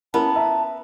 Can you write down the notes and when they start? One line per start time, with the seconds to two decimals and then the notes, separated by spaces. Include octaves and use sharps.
0.14 B3 C#4 E4 A#4 A5
0.35 E5 A#5